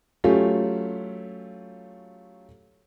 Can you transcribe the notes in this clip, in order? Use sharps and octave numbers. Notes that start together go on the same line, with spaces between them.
F#3 A3 C#4 F4 G4